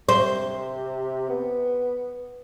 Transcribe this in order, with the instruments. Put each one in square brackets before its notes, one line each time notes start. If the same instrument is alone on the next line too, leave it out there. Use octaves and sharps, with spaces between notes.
[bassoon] C3 [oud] C5
[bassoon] B3